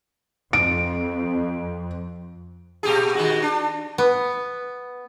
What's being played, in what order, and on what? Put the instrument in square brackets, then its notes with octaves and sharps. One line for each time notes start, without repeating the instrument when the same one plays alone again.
[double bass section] F2 [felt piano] D7
[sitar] A#2 G4 G#4
D#3 G#3 F#4
D4
[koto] B3